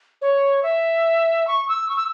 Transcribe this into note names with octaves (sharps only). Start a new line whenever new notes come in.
C#5
E5
C#6
E6
C#6
E6